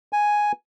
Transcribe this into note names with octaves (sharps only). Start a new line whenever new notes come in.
G#5